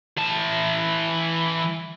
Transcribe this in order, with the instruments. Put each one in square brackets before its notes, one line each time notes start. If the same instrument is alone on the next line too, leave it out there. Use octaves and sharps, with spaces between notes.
[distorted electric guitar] E3 A5